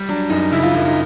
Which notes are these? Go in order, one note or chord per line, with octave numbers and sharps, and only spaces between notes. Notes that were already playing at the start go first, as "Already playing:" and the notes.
Already playing: G3
F#3 D4
F#2 D#4
C#3 E4
F4
F#2 E4
D#4